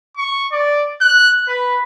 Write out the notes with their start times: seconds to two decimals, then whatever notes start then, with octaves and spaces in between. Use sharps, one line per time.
0.17 C#6
0.52 D5
1.01 F#6
1.48 B4